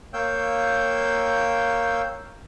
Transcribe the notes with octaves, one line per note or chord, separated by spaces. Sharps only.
A#3 C#5 F5 G5 E6 G6